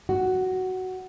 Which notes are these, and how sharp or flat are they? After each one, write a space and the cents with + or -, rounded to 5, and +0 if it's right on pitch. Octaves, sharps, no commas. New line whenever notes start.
F#4 +10